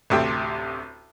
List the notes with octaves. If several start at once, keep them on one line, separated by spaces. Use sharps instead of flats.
A1 D2 C3 G5